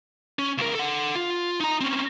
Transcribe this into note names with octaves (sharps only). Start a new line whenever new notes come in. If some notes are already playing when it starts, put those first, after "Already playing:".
C#4
C#2 A#4
A4 F#5
F4
D#4 A#5
C4 C#4